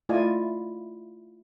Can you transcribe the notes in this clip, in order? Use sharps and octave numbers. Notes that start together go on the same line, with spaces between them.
A3 E4 F4 D5 D#5 G#5